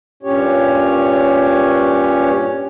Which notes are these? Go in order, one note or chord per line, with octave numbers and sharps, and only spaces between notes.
G2 A#2 C#4 G4 C#5